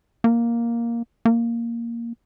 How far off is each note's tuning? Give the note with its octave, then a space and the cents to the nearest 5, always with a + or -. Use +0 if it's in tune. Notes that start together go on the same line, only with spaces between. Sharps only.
A#3 +5
A#3 +0